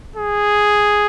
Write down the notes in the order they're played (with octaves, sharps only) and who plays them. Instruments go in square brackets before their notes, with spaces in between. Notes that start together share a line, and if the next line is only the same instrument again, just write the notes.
[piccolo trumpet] G#4